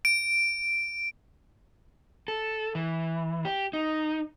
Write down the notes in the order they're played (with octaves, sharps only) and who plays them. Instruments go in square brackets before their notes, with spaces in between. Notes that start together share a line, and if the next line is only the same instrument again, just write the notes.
[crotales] D7
[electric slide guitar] A4
E3
G4
D#4